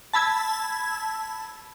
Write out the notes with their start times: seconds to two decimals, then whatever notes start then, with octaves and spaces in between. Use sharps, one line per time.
0.14 A5 B5 E6 G#6